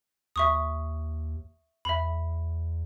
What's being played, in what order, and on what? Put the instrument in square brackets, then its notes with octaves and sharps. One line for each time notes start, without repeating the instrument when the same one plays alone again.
[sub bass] D#2 [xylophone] E5 C#6 D#6
[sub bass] E2 [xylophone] E5 B5